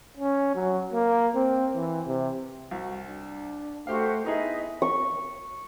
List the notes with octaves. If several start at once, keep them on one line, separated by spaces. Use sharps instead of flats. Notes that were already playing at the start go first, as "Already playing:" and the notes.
C#4
F#3
A#3
C4
E3
C3
C2 F#4
D4
A3 F#4 G4 C5 E5 F5
B3 D#4 E4 G#4 D#5 E5
C#6